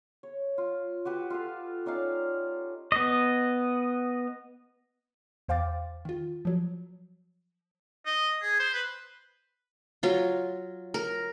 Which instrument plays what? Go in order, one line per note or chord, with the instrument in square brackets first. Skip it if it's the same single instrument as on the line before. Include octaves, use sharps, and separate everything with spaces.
[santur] C#5
F4
F#4 G4 B4 F#5
F4 A4 F5
C#4 D#4 D5 F5
[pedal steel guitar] B3 D#5
[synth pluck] E2 C5 F5 G5 D6 A6
D#3 F4
F3 F#3
[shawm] D#5
G#4
C5
B4
[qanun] F#3 F4
A#4